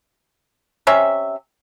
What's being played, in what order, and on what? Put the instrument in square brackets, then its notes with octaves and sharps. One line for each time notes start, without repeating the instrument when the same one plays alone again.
[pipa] C3 C#4 E5